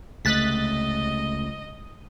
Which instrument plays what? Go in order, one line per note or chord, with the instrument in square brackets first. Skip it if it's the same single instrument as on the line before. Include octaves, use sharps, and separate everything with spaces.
[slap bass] C#2 C3 [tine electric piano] A3 [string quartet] D#5 [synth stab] F#6 A6 B6